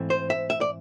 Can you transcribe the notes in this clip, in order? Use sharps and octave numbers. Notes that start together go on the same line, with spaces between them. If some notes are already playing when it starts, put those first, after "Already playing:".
Already playing: G#2 E3 A3 C4
C5
E5
E5
D5